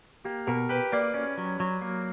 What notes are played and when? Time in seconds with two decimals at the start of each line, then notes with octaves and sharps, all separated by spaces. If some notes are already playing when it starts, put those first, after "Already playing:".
0.24 A#3 G4
0.47 B2 A#4
0.69 G4 B4
0.92 A#3 D5
1.13 C#4 D5
1.38 F#3
1.60 F#3
1.81 A#3